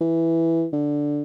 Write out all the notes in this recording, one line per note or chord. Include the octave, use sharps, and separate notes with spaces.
E3
D3